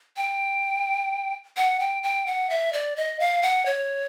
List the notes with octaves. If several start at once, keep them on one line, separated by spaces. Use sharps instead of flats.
G5
F#5
G5
G5
F#5
E5
D5
D#5
F5
F#5
C#5